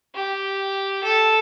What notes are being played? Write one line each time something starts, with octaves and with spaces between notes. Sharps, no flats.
G4
A4